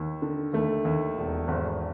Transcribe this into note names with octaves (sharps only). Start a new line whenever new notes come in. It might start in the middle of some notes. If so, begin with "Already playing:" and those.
Already playing: D#2
D3
D#2 A3
D#2
E1
G#1